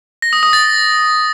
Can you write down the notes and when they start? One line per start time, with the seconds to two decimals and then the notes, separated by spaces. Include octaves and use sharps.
0.22 A#6
0.33 D#6
0.43 D#6
0.53 A6